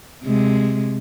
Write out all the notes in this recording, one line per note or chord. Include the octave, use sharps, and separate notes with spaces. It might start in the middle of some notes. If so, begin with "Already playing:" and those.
C3 G#3